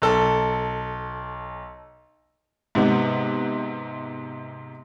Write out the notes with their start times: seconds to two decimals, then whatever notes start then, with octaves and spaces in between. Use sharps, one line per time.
0.02 B1 A4
2.75 G#2 C3 B3